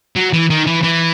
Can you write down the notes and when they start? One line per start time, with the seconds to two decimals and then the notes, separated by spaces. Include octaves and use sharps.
0.16 F#3
0.33 E3
0.50 D#3
0.67 E3
0.84 E3